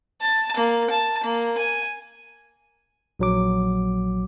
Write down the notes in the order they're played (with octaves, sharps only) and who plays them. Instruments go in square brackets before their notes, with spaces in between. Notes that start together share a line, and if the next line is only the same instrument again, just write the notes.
[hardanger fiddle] A5
A#3
A5
A#3
G#5
[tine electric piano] A#1 F#3 D6